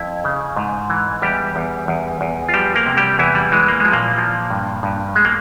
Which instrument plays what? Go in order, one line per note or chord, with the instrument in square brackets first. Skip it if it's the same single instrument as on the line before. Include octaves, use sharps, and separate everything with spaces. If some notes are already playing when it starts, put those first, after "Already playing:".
Already playing: [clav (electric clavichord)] F2 E4 E5
C#3
G#2
E3
E2 G3 G4
E2
E2
E2
F4
F3 G3 G4
A#3 A#4
C3
G3 G4
E2 E3 E4
G3
E3 G#3
A#3
F3 G#3
A#2 A#3
F3
G2
G2
G#3
A#3